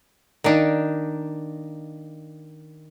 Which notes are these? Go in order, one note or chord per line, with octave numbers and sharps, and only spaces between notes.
D#3 A#3 D4 D#4